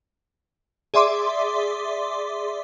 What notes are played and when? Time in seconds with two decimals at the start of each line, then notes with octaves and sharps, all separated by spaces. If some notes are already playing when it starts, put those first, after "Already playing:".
0.94 G#4 D5 E5 C6 D6